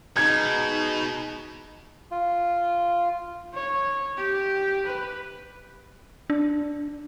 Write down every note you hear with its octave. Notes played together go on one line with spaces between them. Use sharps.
B2 G#3 D#4 G#6
F4
C#5
G4
B4
D4